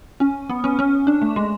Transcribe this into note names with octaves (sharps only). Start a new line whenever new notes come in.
C#4
B3
C#4
C#4
D4
A3
G#3